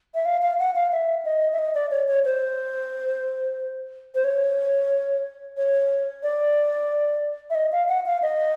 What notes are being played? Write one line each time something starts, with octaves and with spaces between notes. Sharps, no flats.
E5
F5
F5
F#5
F5
E5
D#5
E5
D#5
D5
C#5
C#5
C5
C5
C#5
C#5
D5
E5
D#5
F5
F#5
F5
D#5